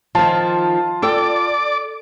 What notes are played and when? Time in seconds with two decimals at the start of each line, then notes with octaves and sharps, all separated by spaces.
0.15 D#3 F3 F4 A5
1.02 A4 D5 G5 D6